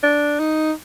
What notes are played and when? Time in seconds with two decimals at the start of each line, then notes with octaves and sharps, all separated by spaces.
0.04 D4
0.39 D#4